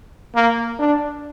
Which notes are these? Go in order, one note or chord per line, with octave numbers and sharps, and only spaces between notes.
A#3
D4